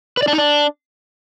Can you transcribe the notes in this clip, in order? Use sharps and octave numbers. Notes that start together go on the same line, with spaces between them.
B4
D5
D4
D#4
D4